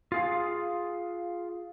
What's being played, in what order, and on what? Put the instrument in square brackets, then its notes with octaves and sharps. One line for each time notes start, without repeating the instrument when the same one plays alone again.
[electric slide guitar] F4 G#4 F5